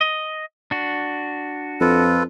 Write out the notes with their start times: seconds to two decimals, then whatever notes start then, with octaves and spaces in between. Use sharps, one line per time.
0.01 D#5
0.71 D4 F#4
1.81 F2 F4 A4 B4